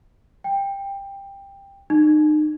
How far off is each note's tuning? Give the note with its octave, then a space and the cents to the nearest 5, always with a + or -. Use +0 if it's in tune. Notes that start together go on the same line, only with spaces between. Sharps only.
G5 +15
D#4 -35